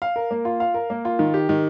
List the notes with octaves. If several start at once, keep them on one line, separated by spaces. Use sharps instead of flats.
F5
A#4
A#3
F4
F5
A#4
A#3
F4
D#3
G4
D#3